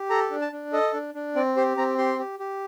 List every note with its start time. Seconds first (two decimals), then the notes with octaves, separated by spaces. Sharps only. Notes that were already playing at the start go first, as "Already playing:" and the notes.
Already playing: G4
0.10 A4 A#5
0.31 D4
0.41 A5
0.52 D4
0.73 A4 D#5
0.94 D4
1.15 D4
1.36 C4 D5
1.56 G4 C5
1.77 C4 A#5
1.98 G4 C6
2.19 G4
2.39 G4